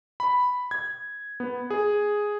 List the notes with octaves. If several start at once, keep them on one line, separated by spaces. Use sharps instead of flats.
B5
G#6
B3
G#4